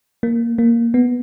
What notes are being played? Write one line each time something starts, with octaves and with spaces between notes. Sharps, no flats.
A#3
A#3
B3